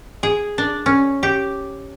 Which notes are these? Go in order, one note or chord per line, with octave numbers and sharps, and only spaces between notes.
G#4
D4
C#4
G4